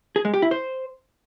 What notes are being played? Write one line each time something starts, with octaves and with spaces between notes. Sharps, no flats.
G#4
G#3
G4
E4
C5